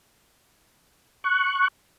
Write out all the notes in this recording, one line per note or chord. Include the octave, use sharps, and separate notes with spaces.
C#6 F#6